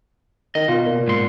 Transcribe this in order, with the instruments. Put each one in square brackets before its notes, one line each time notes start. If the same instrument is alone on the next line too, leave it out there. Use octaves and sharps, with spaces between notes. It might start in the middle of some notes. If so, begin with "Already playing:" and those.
[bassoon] D#3 [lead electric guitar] D#5
[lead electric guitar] B2 [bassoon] F4
[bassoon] A#2
[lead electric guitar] G#2 C6